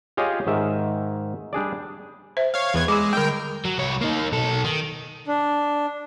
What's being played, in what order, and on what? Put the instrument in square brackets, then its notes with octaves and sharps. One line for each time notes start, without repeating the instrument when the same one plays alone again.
[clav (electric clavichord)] F4 G4 G#4 C#5 D#5 G#5
G#2 D#3 E5
G3 D4 G#4 D5
[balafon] C5 E5
[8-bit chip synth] C#5 F5
E2 B3 G#6
[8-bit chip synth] G#3 [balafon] G#4 B5 D6
[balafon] D3 G3 [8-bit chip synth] A#4 G5
[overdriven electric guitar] F#3
C2 C#5
A#3 D#4
B1 A4
D#3
[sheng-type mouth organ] D4